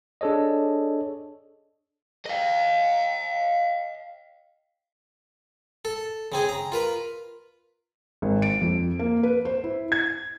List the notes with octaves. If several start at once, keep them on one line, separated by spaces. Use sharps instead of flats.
D4 G#4 A4 C#5 D#5
D#5 F5
A4
C#3 C4 G#4
A#5
F4 A#4 B4
G#1
D7
F2
A#3
B4
C5
E4
G#6